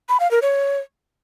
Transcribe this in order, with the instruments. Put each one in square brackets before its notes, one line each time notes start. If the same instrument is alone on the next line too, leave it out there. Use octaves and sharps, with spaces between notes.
[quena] B5
F5
A#4
C#5